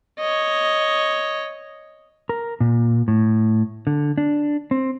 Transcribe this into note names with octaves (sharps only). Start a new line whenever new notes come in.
C#5 D#5
A#4
A#2
A2
D3
D4
C4